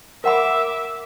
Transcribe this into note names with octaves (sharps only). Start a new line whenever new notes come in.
A#4 E5 F#5 B5 D6